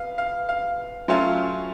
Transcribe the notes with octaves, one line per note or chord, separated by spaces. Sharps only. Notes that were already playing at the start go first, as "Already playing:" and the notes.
Already playing: B3 F5
F5
F5
F#3 A3 C#4 F4 C6